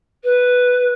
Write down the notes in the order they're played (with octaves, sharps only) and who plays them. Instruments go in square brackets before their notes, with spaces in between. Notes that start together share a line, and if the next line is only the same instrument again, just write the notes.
[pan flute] B4